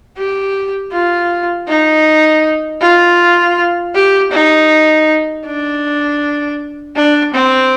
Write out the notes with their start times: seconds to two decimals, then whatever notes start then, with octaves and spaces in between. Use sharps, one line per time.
0.17 G4
0.92 F4
1.68 D#4
2.81 F4
3.95 G4
4.32 D#4
5.45 D4
6.96 D4
7.34 C4